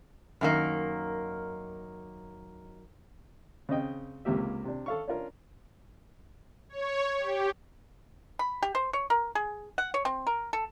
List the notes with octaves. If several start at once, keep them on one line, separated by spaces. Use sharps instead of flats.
F#2 D#3 A#3
C#3 C4 D#5 G5
C#2 C3 A#3 G4 E5
C3 D4
A4 F5 C#6
C#4 D4 F4 A#4
C#5
G4
B5
G4
C5
C#5
A#4
G#4
F#5
C#5
C4
A#4
A4